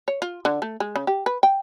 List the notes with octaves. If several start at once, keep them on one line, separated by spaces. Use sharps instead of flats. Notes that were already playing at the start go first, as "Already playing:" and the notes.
C#5
F4
D3
A3
G#3
C#3
G4
B4
G5